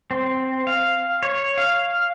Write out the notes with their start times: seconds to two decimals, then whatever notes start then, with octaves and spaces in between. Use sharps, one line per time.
0.11 C4
0.67 F5
1.23 C#5
1.58 F5